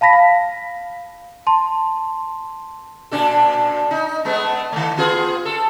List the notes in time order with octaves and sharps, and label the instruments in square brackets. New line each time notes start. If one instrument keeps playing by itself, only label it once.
[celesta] F5 A5 B5 A#6 B6
F5
A5 C6
[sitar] A#2 D4 A4
D#4
G#3 A3 B3
D#3 A3
B3 F4 G#4
A4